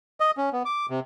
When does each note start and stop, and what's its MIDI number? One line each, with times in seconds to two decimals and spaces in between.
0.20 0.31 75
0.37 0.50 61
0.53 0.63 59
0.65 0.86 86
0.90 1.00 48